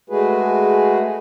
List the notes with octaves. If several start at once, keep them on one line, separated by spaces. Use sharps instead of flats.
G#3 A3 F#4 G#4 B4